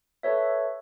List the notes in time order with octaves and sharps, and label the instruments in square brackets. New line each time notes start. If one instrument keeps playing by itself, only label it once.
[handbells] A4 B4 C#5 E5